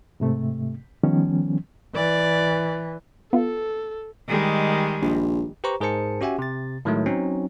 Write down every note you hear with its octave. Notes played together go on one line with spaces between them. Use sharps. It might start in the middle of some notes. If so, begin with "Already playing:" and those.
G#2 C3 A3
D#3 F3 G3 B3 C#4
E3 D5
B3 F4 A4
D#3 G3 G#3
A#1
G4 B4 C5 A#5 C#6
G#2 G#4 A#4 C5 A5 C#7
C#4 F#4 G4 E5 F#5 G#5
C3 A6
A2 D#3 F#3 G#3 A3
F#3 C4 C#4 D#4